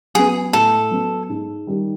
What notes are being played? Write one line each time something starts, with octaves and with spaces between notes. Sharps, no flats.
F#3 B3 G#4
A2 A4
F#3 B3
G#2
D#3 G3